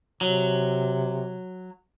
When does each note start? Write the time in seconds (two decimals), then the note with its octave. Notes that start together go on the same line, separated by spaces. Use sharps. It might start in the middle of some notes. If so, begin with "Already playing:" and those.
0.21 C3 F#3